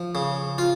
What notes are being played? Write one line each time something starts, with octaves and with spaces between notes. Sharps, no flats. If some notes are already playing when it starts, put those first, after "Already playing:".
Already playing: F3
C#3
F4